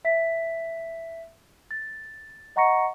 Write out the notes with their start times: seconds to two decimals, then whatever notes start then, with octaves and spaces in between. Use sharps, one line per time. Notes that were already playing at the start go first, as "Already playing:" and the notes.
0.05 E5 B6
1.71 A6
2.56 D#5 F#5 A#5 C#6 A#6 C#7